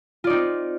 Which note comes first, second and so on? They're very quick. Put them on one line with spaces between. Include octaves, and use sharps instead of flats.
F4 D5 D#4 C4